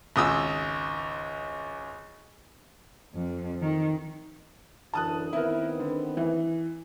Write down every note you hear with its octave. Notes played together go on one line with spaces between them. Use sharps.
G#1 C#2 D#6 E6
F2
D#3
F#2 D3 E3 A5 D#6 F#6
D#3 B3 C4 E4 A#4
D3
E3